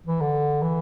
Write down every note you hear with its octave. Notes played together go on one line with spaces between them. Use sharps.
E3
D3
E3